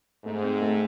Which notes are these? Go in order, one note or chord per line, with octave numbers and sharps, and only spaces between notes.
G#2 A3
C4
A3